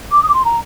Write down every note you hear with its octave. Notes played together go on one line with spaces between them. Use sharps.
D6
D#6
D6
C6
A#5